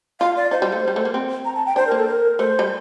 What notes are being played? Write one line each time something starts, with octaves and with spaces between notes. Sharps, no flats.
F4 F5
D5
D#4 C5
G3
A3
G3
A3
A#3
C4
A#5
A5
G5
D4 C5
A#3 A#4
A4
A#4
A3 C5
G3